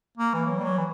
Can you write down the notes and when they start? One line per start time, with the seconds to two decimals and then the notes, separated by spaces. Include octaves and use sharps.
0.17 A#3
0.34 E3
0.46 F#3
0.58 G3
0.64 F#3
0.78 E3